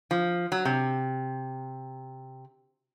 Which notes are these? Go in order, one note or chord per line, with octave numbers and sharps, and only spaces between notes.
F3
F#3
C3